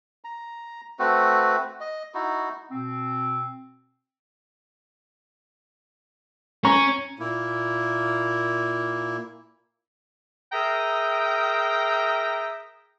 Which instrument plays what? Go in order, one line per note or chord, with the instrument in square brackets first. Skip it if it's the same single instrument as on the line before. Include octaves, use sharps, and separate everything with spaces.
[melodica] A#5
A3 C4 F#4 B4
D#5
D#4 E4 F#4
[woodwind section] B2 C4
[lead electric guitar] C#4 [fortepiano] A#5 C#6
[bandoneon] A#2 A#3 E4
[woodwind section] G#4 A#4 E5 G5 A#5 D#6